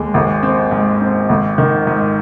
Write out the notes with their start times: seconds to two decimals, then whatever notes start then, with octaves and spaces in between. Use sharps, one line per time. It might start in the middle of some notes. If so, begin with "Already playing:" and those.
Already playing: D#2 G#3
0.14 G#1
0.43 C4
0.71 G#2
1.01 C4
1.29 G#1
1.58 D#3
1.87 G#2